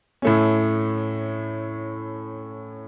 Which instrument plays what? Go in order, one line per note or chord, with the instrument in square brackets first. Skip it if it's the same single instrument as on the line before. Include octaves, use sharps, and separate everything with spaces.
[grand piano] A2 A3 C#4